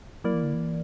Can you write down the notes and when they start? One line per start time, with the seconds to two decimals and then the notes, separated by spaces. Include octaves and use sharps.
0.24 F#3 A#3 E4 A#4 D5
0.34 E3
0.43 D3
0.54 E3